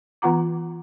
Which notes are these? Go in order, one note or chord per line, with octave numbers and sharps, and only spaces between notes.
E3 B3 F4 F#5 A#5 D6